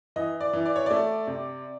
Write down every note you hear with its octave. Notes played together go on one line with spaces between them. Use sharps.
E3 D#5
D5
E3
D5
C#5
A3 D5
C3